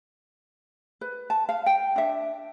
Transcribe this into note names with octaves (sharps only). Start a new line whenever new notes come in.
B4
A5
F5
G5
D4 E5